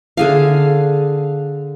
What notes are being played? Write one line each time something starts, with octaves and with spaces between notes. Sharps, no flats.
D3 G#4 F5